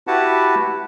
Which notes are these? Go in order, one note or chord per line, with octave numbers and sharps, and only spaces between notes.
E4 F#4 G4 B4 F#5 A5